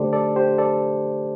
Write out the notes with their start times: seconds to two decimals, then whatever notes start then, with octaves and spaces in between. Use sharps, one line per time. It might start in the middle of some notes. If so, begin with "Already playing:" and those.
Already playing: D3 A3 D4 G4 A4 C5 D5
0.13 A4 D5
0.36 G4 C5
0.58 A4 D5